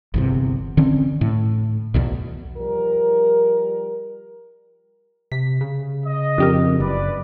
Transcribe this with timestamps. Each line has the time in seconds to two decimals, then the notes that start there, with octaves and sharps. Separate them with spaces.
0.14 G1 E2 C3
0.77 D3 E3 C4 C#4
1.21 A2
1.94 B1 E2 B2
2.56 F3 G3 A#4
5.32 C3 B6
5.61 C#3
6.06 D#5
6.38 F2 D4 G4 A#4
6.80 F#1 B4 D5